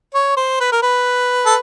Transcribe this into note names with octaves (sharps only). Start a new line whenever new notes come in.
C#5
C5
B4
A#4
B4
A4